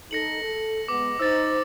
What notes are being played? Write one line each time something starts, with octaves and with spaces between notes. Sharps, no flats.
D#4 A4 A#6 C#7 F#7
A4
G#3 B3 D6
D#4 C5 E6 A6